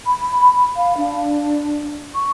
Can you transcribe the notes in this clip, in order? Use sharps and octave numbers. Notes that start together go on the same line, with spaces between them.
B5
F5
D4
C#6